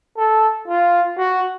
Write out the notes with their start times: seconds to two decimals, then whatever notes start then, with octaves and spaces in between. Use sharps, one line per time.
0.17 A4
0.68 F4
1.17 F#4